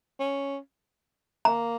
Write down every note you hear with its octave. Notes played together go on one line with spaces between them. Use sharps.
C#4
A#3 A#5